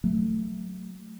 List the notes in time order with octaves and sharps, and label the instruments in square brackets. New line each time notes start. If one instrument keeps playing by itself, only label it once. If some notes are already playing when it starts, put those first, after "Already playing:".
[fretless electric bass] F#3 A3